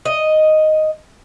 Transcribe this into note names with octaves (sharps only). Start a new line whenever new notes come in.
D#5